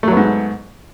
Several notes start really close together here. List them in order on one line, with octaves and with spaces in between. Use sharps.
A3 F#3 B3 G#2